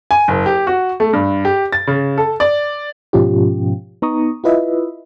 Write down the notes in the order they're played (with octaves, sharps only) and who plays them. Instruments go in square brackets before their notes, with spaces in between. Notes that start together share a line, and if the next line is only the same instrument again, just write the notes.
[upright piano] G#5
F#1
G4
F#4
A3
G2
G4
A6
C#3
A4
D5
[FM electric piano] G#2 B2 F3 C#4 F4 G4
B3 D#4 A#5 C#6 D#6
E4 F4 B4 D#5 E5